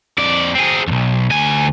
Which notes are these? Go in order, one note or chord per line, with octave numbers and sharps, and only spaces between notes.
F2 D5
C4 G#4
B1 F2
D2 G#5